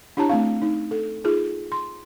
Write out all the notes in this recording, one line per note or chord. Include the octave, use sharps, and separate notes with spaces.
D4 E4 G4 C#5 A5 A#5
A3 C4 F5
D#4
A4
D#4 F4 G#4
C6